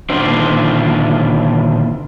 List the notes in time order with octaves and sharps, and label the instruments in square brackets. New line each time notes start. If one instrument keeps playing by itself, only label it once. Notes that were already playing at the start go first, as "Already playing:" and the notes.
[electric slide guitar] A#2 D3 D#3 D4 C5